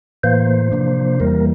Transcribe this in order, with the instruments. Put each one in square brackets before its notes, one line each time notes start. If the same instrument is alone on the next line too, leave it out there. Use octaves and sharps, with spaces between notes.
[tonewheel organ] A2 E3 A#3 C5
C3 F3 A#3 D4
E2 E3 G3 A#3 A#4